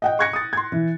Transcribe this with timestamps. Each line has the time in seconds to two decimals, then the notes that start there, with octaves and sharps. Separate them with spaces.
0.02 D#5 F#5 G5
0.19 C#6 F#6 G#6 A#6 C#7
0.33 D#6 A6
0.53 C6 G#6
0.72 E3